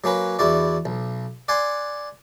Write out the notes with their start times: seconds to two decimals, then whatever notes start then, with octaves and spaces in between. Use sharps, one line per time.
0.04 F#3 A#3 C#4 B4
0.39 E2 E4 F#4 D5
0.85 B1
1.48 D5 F#5 G#5 C6